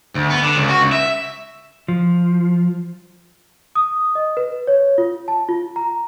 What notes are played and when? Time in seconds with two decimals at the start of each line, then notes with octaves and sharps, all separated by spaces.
0.15 D2
0.30 B3
0.43 D3
0.57 C#2
0.69 F#4
0.81 C#2
0.92 E5
1.88 F3
3.75 D#6
4.15 D#5
4.37 B4
4.67 C#5
4.98 F4
5.28 A5
5.49 F4
5.76 A#5